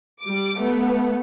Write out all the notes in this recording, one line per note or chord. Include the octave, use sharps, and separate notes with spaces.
G3 D6
A3 B3